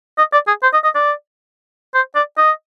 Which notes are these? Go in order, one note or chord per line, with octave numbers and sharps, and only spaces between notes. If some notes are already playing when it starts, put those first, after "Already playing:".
D#5
D5
G#4
C5
D#5
D#5
D5
C5
D5
D#5